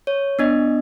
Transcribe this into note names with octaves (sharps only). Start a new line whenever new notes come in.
C#5
B3 D4 D#5